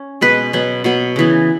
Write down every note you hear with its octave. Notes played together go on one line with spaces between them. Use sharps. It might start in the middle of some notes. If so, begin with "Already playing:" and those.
Already playing: C#4
B2 G#3 B3 B4
B2 F#3 B3
B2 F#3 B3
C#3 E3 B3